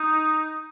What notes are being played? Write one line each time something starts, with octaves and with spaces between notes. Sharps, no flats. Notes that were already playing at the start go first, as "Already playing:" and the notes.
Already playing: D#4